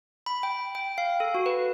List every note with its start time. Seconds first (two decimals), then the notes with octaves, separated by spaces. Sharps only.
0.26 B5
0.43 G5
0.75 G5
0.98 F5
1.20 A4
1.35 F#4
1.46 B4